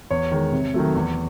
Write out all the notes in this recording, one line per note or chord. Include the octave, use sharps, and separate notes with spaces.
E2 C#5
D#3 G#3
C3
D#3 F#3 A3
E2